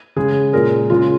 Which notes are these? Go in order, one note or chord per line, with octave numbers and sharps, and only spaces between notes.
C#3 G#3 G#4
A#2 G#3 A#4
C#3 G#3 F4